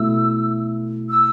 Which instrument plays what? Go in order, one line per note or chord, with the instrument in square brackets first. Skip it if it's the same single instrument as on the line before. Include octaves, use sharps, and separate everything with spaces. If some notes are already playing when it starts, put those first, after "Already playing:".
Already playing: [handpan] B2 A3 E4 A4 [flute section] E6
[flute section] E6